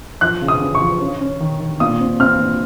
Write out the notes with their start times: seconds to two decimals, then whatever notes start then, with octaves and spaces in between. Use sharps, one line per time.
0.21 F3 F#6
0.42 C#3
0.48 D#6
0.62 C#3
0.75 C#6
0.81 F3
1.01 C#4
1.21 C#4
1.41 D#3
1.60 D#3
1.80 A#2 D#6
2.00 C4
2.20 C4 F6
2.40 A#2